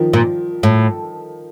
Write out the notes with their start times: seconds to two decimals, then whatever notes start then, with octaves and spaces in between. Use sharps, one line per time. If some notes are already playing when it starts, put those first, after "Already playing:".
Already playing: D#3 F3
0.13 A#2
0.63 A2